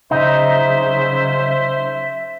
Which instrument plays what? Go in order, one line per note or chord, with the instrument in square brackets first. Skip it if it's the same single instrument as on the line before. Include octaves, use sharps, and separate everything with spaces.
[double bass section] C#3 F#3 [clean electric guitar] D#4 [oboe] C5 [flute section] E5